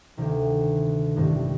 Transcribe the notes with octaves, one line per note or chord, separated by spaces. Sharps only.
D2 C3 D#3
A1 G2 D#3 G#3 C4